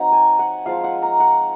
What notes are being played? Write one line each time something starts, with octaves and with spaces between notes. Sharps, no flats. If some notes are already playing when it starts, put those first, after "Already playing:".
Already playing: F#3 C4 D#4 F#5 A#5
G#5
F#5
F3 G#3 C4 F4 F5
F#5
A#5
F#5